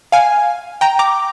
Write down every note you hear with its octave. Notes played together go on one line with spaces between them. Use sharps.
F5 G#5
G5 A#5
A#5 D6